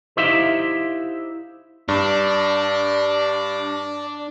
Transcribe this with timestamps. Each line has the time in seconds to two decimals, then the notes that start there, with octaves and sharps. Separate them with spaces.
0.17 D#4 E4 G4 C5 E5 F5
1.88 G2 D4 D5